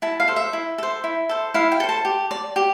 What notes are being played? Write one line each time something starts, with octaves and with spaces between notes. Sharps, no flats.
E4 A5
F5
A4 C5
E5
E4
A4 C5
E4
A4 C5
E4 F5
G5
A4 C5
A5
G4
D5
G4